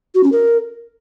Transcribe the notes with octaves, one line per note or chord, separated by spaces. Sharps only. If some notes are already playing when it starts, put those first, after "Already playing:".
F#4
C#4
A#4